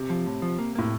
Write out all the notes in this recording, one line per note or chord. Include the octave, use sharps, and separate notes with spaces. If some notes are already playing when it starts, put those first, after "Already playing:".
Already playing: C3
F3
A2
F3
A#3
A2 A#3